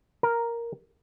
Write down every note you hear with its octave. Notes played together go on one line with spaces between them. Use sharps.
A#4